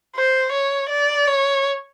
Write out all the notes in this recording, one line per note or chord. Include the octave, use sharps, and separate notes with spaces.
C5
C#5
D5
C#5